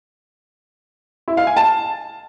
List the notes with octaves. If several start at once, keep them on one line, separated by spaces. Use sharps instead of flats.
E4
F5
G#5
A5